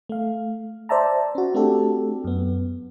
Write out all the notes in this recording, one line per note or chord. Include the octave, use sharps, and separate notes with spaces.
A3 F5
C5 D5 E5 A5 A#5
C#4 F#4
A3 C4 D4 F#4 G4 A4
F#2 B3